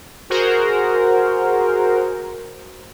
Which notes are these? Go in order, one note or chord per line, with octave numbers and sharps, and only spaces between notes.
F#4 G#4 A#4 C5